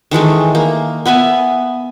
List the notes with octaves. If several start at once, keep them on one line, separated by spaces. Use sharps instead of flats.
D#3 E3 G#3 A3
A#3
B3 B4 E5 G#5